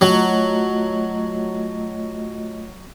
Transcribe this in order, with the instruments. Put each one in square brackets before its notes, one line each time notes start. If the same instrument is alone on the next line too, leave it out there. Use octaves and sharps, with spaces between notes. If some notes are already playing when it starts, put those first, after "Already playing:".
[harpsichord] F#3 [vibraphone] A3 F4 D#5